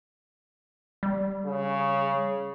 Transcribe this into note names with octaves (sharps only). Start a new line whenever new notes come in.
G3
C#3